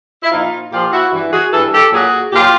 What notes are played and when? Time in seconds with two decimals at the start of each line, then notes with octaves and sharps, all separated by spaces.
0.23 E4
0.31 A#2 F3 D#4 F4
0.71 A#2 F3 F4 G4
0.92 E4 F#4
1.11 G2 E3
1.31 F#4 G#4
1.51 G2 E3 A4
1.73 G4 A4
1.91 A#2 F#3 F#4 G#4
2.32 A#2 F#3 F4 G4